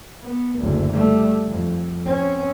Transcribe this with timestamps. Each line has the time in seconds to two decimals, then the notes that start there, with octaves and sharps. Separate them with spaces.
0.24 B3
0.59 F#1 D2
0.93 G3 A3
1.49 F2
2.06 C4 C#4